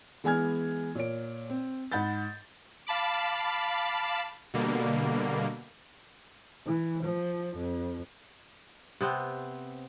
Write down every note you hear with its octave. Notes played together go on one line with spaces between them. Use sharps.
E3 G#3 B3 G#5 F6 G#6
A#2 C#5 D7
C4
G#2 F#5 B5 G6 A6
F5 A5 B5 D6
B2 D3 G3 A#3
E3
F3
F2
C3 B3 C4